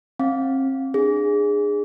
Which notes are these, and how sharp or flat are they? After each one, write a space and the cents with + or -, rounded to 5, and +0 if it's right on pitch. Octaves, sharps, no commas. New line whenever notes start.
C4 +35 F5 +0
D4 +25 G#4 -10